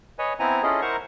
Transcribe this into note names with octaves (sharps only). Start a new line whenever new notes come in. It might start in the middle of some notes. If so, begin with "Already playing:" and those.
B4 C#5 D#5 G#5
B3 C4 E4 G#5 A#5
C#4 E4 F4 G#4 A4 D#5
E4 A#4 C5 F#5 A#5 C#6